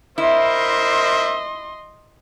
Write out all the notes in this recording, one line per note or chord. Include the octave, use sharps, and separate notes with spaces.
E4 A#4 C5 D#5 E5 C6